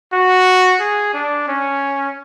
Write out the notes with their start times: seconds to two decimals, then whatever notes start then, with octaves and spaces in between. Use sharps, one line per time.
0.13 F#4
0.81 G#4
1.14 D4
1.48 C#4